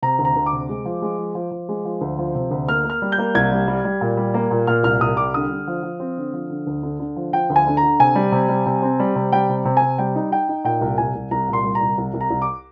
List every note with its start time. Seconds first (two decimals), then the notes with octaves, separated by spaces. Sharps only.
0.02 C3 A#5
0.19 D2
0.25 A#5
0.36 D2
0.46 D6
0.53 C3
0.69 G#3
0.85 F3
1.02 G#3
1.18 F3
1.35 F3
1.51 F3
1.69 G#3
1.85 F3
2.01 D2
2.19 F3
2.35 C3
2.51 D2
2.68 A#3 F6
2.84 A#3
2.90 F6
3.02 G3
3.12 G6
3.18 A#3
3.35 C2 G#6
3.52 G3
3.68 G3
3.85 G3
4.01 A#2
4.17 G3
4.34 A#3
4.51 A#2
4.67 A#2 F6
4.83 C2 F6
5.01 C2 D#6
5.17 G3 D6
5.34 D3 D#6
5.51 D3
5.67 F3
5.83 F3
6.00 C4
6.17 D3
6.33 F3
6.49 D3
6.67 D2
6.83 D3
7.00 D3
7.16 F3
7.33 F3 G5
7.50 D2
7.56 G#5
7.67 D3
7.77 A#5
7.83 D3
8.00 C3 G#5
8.15 G3
8.32 C3
8.49 G3
8.66 C3
8.82 C4
9.00 G3
9.16 C3
9.32 G3 G5
9.49 C3
9.65 C3
9.77 C3 G#5
9.98 G3 G5
10.16 D#4
10.31 D#4 G5
10.49 D#4
10.64 A#2 G5
10.81 C2
10.98 C2 G#5
11.15 C2
11.31 C2 A#5
11.49 A#2 C6
11.64 G3
11.75 A#5
11.81 C2
11.98 C2
12.14 C2
12.21 A#5
12.31 C2
12.42 D6